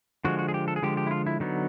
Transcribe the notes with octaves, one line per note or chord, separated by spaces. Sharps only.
D3 F3 G#3 F#4
F#4
G#4
G4
A4
G#4
D3 F3 G#3 G4
G4
E4
F4
E4
D3 F#3 B3 D#4